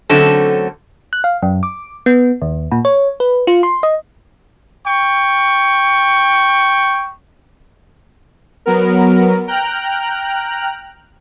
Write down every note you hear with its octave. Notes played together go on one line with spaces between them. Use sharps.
D3 F#3 A3 C4 C#4 A4
F#6
F5
F#2
D6
B3
D#2
A#2
C#5
B4
F4
C6
D#5
G5 C#6
F#3 B3 A#4
G5 A#5 F6 F#6